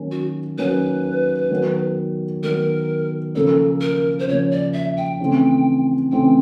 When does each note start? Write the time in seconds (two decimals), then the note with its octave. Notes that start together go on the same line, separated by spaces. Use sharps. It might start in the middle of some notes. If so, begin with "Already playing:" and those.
Already playing: D#3 F#3 A#3 C#4
0.11 F#4
0.57 D#3 F#3 A#3 C#4 B4
1.50 D#3 F#3 B3
2.43 D#3 F#3 B3 A#4
3.35 C#3 F3 A#3 A4
3.81 A#4
4.19 C5
4.27 C#3 F3 A#3 C#5
4.51 D5
4.73 E5
4.97 G5
5.20 C#3 E3 A3 C4
6.12 C#3 E3 A3 C4 G5